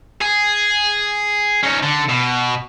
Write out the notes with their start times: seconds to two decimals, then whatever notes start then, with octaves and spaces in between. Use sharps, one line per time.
0.22 G#4
1.63 C#4 D#4
1.83 D3
2.09 B2